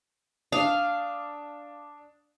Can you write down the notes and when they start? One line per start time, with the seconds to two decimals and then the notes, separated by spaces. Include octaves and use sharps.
0.52 D4 F5 D#6